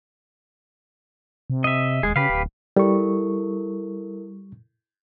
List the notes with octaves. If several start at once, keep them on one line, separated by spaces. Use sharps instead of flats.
C3
D#5 E5
D#1 G#3 G#4
C#3 G4 B4 F5
D1
G3 E4 A4 A#4 C#6